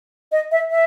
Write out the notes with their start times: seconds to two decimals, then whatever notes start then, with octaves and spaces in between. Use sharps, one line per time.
0.32 D#5
0.52 E5
0.71 E5